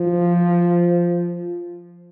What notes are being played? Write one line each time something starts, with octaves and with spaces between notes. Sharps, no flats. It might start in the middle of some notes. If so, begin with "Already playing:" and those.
Already playing: F3